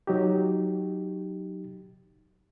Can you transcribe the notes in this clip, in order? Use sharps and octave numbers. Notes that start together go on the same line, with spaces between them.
F#3 D#4 G4